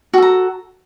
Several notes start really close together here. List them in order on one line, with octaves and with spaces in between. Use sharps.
F#4 A4 A#5